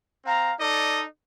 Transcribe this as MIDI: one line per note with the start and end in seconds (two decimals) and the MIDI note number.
0.25 0.53 60
0.25 0.53 77
0.25 0.53 82
0.59 1.03 63
0.59 1.03 69
0.59 1.03 74
0.59 1.03 75